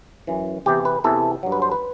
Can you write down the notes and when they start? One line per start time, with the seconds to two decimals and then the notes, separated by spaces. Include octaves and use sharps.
0.27 F#2 E3
0.66 E2 C3 E3 G4
0.85 B4
1.04 E2 C3 E3 A4
1.43 G2 F#3
1.52 B4
1.62 C5
1.71 B4